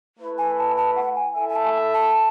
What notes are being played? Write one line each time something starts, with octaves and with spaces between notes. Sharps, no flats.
A3 E4 B4
G#5
A5
A5
F#5
G#5
E4 A4 E5 G#5
G#5
A5
A5